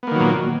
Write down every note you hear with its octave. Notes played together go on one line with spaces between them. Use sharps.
A#2 D#3 F#3 A#3 B3